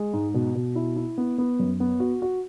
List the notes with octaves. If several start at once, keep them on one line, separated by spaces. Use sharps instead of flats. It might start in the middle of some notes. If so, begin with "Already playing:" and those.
Already playing: G#3
G#2
B2
B2
E4
E4
B3
B3
F#2
B3
F#4
F#4